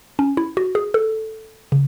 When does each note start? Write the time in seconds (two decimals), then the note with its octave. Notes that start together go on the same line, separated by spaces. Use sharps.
0.19 C#4
0.37 E4
0.57 F#4
0.75 G#4
0.94 A4
1.72 C#3